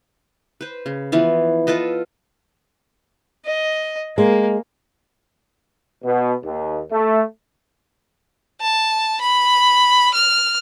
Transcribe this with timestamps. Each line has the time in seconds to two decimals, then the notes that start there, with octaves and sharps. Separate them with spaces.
0.61 B4 C5
0.86 C#3
1.12 E3 F3 B3
1.67 F4 A4 B4 D#5
3.45 D#5
4.18 G#3 A#3
6.03 B2
6.44 D#2
6.92 A3
8.61 A5
9.21 B5
10.14 F6